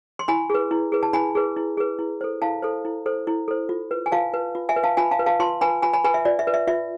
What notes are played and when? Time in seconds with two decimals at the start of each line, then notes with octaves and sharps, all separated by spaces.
0.19 C6
0.28 E4 G#5 B5
0.50 G#4 B4
0.71 E4
0.92 G#4 B4
1.03 A5
1.13 E4 G#5 B5
1.35 G#4 B4
1.57 E4
1.77 G#4 B4
1.99 E4
2.21 A4 C5
2.42 E4 F5 A5
2.62 A4 C5
2.85 E4
3.06 A4 C5
3.27 E4
3.48 A4 C5
3.69 F4
3.91 B4
4.06 G#5
4.12 F4 F5 A5
4.34 B4
4.55 F4
4.69 E5 G#5
4.76 B4
4.84 F5 A5
4.97 F4 G#5 B5
5.11 F5 A5
5.19 B4
5.26 F5 A5
5.40 F4 A5 C6
5.61 B4 G#5 B5
5.82 F4 G#5 B5
5.93 G#5 B5
6.04 B4 G#5 B5
6.14 E5
6.25 F4 D5
6.39 E5
6.47 B4
6.54 E5
6.67 F4 E5